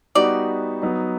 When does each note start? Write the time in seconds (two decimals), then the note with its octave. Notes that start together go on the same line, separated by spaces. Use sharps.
0.15 G3 B3 D#4 F#4 D5
0.82 F#3 B3 D#4